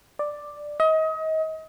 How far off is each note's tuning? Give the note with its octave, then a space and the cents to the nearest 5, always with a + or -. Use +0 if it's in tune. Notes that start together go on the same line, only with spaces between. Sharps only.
D5 +5
D#5 +30